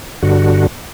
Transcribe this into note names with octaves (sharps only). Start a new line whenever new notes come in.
G2 D3 F#4